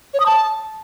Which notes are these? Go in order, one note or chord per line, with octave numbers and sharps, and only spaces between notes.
C#5
D#6
A5